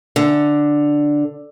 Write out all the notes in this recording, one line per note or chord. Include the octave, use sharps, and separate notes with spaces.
D3